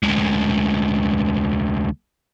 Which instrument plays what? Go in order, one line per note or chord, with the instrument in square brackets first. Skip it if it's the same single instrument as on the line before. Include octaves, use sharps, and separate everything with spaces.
[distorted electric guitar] D2 G#3